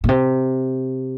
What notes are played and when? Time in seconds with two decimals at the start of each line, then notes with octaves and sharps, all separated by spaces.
0.04 A#2
0.09 C3